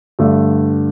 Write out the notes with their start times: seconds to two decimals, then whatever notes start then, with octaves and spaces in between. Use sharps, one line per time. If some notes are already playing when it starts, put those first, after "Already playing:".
0.19 G2 D3 A3